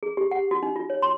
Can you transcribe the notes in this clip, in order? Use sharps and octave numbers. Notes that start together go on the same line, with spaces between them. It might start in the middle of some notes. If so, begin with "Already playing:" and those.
G#4
G4
F#5
F#4
D#4
F4
C#5
C6